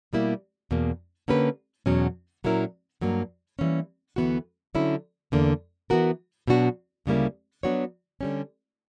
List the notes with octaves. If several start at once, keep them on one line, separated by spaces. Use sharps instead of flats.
B2 G3 A#3 E4
E2 B2 A#3
D3 A#3 C#4 G4 B4
E2 B2 F#3 C#4
A#2 F#3 C#4 E4 A#4
G2 F#3 A#3
E3 G3 A#3 C#4
D2 C#3 E3 B3 F#4
D3 F#3 C#4 E4
E2 D3 A#3
E3 B3 F#4 A#4
B2 F#3 B3 D4 F#4
D2 C#3 G3 A#3 E4
F#3 B3 D4 F#4 C#5
D3 G3 C#4